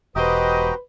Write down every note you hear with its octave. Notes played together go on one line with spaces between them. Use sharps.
E1 F#4 G4 B4 C5 D#5 G5 A#5